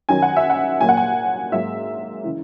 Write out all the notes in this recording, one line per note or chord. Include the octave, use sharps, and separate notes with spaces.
F#2 D#3 F#3 G#5
F#5
E5
F#5
A#2 F#3 A#3 G#5
F#5
G#5
G#2 F#3 A#3 E5
C#3 E3